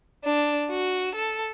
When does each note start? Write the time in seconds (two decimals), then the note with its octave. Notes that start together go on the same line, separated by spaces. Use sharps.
0.24 D4
0.70 F#4
1.15 A4